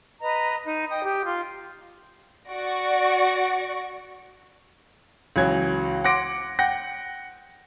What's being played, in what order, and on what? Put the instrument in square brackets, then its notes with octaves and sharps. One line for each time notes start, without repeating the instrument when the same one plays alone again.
[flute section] B4 D#5 A#5
D#4
D#5 G5 D#6
G4
F4 C6
[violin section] F#4 D5 C#6 A#6 D7
[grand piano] C#2 E3 F#3 G#6
F#5 C6 D6 A#6 D7
F#5 G5 A#6